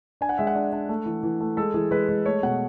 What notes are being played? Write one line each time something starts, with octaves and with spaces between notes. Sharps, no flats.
D4 G#5
F#5
G#3 E5
F#5
D4
D4
A3
E3
E3
A3
G#3 A4
E3 G#4
G#3 B4
G#3
A3 C#5
B2 F#5